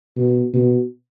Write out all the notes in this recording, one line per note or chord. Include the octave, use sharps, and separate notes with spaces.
B2
B2